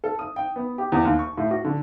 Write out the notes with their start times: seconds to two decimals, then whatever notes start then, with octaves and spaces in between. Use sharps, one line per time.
0.04 A4
0.19 D#6
0.36 G5
0.56 B3
0.78 G4
0.92 E2
1.05 D#2
1.19 C#6
1.38 A2
1.51 F#4
1.64 D3